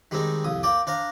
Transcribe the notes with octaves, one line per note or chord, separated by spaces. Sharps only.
D#3 G3 G#3 C4 D#4
C2 F2 D#6
A#3 D5 G5 D6
D4 C5 F5 A#5